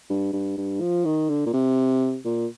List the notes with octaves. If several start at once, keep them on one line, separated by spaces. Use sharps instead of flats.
G2
G2
G2
F3
D#3
D3
A#2
C3
A#2